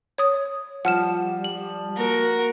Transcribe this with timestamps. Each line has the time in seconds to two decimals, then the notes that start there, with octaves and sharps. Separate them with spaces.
0.18 C#5 D#6
0.85 F3 G3 F#5 F6 E7
1.44 F#7
1.97 A#3 F#4 A#4